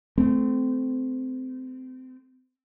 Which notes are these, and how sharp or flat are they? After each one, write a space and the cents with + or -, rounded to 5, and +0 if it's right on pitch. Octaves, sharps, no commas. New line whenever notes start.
A3 -20 C4 -25